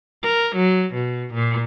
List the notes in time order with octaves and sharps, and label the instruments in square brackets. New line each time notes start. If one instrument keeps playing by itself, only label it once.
[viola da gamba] A#4
F#3
B2
A#2